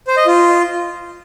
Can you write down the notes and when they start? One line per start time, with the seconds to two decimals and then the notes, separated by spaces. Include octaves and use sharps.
0.07 C5
0.17 D#5
0.27 F4